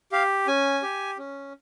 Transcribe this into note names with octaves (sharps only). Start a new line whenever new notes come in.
G4 F5
C#4 G#5
G4
C#4